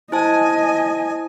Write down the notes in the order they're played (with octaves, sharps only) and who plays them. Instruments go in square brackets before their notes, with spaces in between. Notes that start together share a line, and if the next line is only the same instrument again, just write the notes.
[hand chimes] E4 C5 A5 [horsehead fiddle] D#5 [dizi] G#5